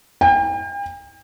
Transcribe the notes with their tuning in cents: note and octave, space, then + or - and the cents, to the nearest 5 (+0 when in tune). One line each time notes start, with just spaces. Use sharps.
G5 +40